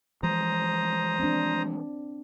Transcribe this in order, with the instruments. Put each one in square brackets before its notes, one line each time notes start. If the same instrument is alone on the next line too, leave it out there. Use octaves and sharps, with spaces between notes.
[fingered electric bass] E3 F3 G#3 [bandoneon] C5 A#5 D#6
[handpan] C4 D4